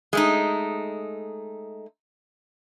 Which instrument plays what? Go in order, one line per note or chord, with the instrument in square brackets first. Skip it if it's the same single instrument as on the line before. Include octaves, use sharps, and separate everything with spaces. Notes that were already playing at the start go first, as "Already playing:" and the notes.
[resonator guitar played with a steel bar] G#3 A3 D#4